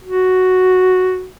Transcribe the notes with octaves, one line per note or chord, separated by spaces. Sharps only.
F#4